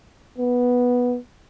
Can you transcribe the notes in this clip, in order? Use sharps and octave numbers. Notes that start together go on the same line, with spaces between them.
B3